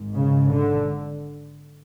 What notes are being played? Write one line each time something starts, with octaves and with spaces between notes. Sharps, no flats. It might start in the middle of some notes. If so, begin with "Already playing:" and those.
Already playing: G#1 G#2
C#3
D3